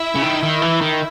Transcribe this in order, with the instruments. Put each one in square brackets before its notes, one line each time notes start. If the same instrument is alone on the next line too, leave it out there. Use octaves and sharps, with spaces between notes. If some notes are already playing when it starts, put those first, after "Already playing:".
Already playing: [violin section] E4 E5
[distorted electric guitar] C#3
D#3
D#3
E3
D#3